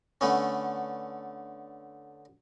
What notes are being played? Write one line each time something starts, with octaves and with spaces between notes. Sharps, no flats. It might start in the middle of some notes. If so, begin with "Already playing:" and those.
D3 A3 B3 C#4